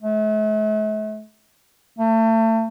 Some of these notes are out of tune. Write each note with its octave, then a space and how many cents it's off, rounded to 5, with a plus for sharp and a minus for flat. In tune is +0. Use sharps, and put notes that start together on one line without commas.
A3 -40
A3 +35